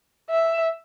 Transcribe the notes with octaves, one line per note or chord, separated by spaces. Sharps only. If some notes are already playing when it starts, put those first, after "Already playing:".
E5